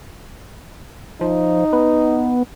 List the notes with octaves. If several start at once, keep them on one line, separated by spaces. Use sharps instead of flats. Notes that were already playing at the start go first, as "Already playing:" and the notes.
F3 D#4
B3